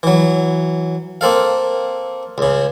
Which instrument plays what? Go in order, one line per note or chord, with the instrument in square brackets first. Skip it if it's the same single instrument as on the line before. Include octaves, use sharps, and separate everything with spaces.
[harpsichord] E3 F#3
A#3 C4 A4 F5
C#2 C#3